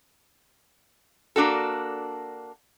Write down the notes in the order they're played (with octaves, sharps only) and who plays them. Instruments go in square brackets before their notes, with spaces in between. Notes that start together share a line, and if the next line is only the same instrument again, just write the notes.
[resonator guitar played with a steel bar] A#3 D4 F#4 A4